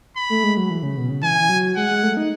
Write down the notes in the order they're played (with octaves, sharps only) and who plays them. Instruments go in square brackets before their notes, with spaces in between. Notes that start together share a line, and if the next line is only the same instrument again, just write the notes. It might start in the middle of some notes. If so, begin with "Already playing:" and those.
[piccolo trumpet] B5
[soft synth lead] A3
G#3
F#3
E3
C#3
B2
C#3
[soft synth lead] E3 [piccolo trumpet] G#5
[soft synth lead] E3
F#3
[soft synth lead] G#3 [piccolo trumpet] F#5
[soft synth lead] G#3
A3
D#4